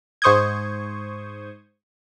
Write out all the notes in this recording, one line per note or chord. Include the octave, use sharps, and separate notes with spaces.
G#2 C5 C#6 D#6 G6 G#6